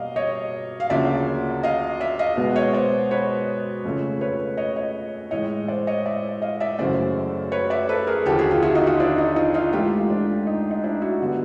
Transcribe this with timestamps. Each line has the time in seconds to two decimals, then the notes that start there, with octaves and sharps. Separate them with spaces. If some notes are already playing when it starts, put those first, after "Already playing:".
Already playing: B2 G3 A#3 D5 D#5 F5
0.16 C#5 D#5
0.80 F5
0.90 D2 C#3 F3 A#3 D5 E5
1.63 D#5 F5
2.00 D5 E5
2.19 D#5 F5
2.37 B2 G#3 B3
2.56 C#5 D#5
2.73 C5 D5
3.11 B4 C#5
3.85 F2 C#3 F3 A3
4.21 B4 C#5
4.57 C#5 D#5
4.76 C#5 D#5
5.31 A2 E3 G#3 C#5 D#5
5.68 C5 D5
5.87 C#5 D#5
6.06 D5 E5
6.42 D#5 F5
6.60 D5 E5
6.78 F#2 C#3 E3 A3 C5 D5
7.52 B4 C#5
7.70 D5 E5
7.89 A4 B4
8.07 G#4 A#4
8.25 D#2 D3 F3 G4 A4
8.39 F#4 G#4
8.51 F4 G4
8.62 E4 F#4
8.75 D#4 F4
8.87 D#4 F4
9.00 D4 E4
9.18 D#4
9.36 D#4 F4
9.54 D#4 F4
9.73 G#2 E3 A3 F4 G4
10.10 D4
10.47 D#4
10.71 D#4
10.83 D4 E4
11.01 E4 F#4
11.22 D3 G3 B3